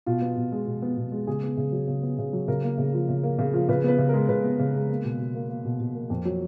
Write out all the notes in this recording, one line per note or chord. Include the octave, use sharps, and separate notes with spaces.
B2 F4
B3
B2
G#3
B2
B3
B2
G#3
C#3 G#4
B3
C#3
F#3
C#3
B3
C#3
F#3
C#3 A#4
A#3
C#3
F3
C#3
A#3
C#3
F3
C#3 B4
B3 B4
C#3
G#3 A#4
C#3 B4
B3
C#3
G#3
A#3
B2
B2
A#3
A#3
B2
B2
A#3
F2
F#3